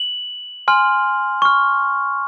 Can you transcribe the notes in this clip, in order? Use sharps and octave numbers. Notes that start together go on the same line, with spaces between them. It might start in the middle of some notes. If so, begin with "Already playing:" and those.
Already playing: F#7
G#5 C6 F6
C#6 F6